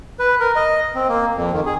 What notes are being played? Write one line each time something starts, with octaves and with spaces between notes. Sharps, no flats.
B4
A#4
D#5
C4
A#3
F2
D#3
G#4